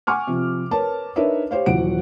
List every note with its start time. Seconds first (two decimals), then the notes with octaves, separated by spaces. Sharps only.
0.07 F#5 G#5 C#6 D6 F6
0.27 C3 F3
0.71 A#4 B4 C#5 A5
1.16 D4 D#4 A#4 B4 C#5 E5
1.51 G4 C5 C#5 F5
1.66 D#1 E3 F#3 F#5 D7